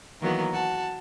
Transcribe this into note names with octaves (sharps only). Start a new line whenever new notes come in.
D#3 E3 F#3 A#3 B3
F#4 A5